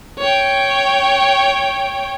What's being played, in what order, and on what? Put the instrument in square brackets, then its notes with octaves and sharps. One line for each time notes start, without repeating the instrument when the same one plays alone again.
[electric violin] C#5 G5